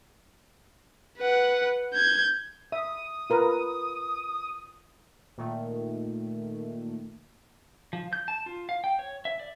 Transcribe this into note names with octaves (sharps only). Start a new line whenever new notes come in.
B4 F#5
G6 G#6
E5 D#6
F4 A#4 B4
A#2 D#3 A3
F3
G6
A5
F4
F5
G5
C#5
E5
D5